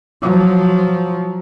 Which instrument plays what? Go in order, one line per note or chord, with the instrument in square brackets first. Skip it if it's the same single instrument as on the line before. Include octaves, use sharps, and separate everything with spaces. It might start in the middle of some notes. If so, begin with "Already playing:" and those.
[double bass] F3 F#3